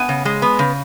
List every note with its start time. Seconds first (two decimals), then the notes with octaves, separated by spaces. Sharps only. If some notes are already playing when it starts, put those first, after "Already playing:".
Already playing: B3 G#5
0.09 C#3
0.25 G#3
0.42 B3
0.59 C#3